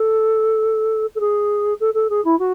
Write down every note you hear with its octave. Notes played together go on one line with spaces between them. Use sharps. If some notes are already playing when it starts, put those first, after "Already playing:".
Already playing: A4
A4
G#4
A4
A4
G#4
E4
F#4